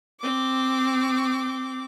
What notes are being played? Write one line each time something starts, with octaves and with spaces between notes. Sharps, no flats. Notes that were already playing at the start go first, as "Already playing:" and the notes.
C4 D6